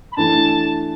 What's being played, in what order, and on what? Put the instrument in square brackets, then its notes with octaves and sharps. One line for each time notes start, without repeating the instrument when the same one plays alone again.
[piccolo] B5
[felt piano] E3 A3 D4 [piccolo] A5